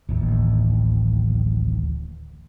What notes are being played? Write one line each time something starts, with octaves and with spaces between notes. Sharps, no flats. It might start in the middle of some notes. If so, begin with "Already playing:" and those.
D1 A1 D#2